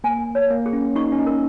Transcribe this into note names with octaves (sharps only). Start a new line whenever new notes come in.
A#3 G#5
C#5
A#3
G#4
C#4
D#4 C#6
C#4
D#4
A#4